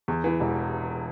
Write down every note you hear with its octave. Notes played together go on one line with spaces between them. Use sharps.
E2
E3
E1